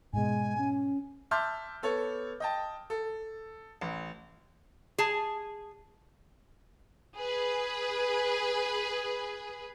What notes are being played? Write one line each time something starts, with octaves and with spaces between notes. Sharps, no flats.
G#2 B2 G#3 G#5
C#4
E5 A5 C6 D6 F6 G6
B3 A4 C#5
D#5 G5 A5
A4
A1
G#4 A5
G#4 B4